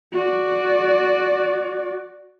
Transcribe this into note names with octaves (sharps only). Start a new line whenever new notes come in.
F#4 D5